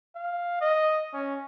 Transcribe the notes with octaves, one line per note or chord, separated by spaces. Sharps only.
F5
D#5
C#4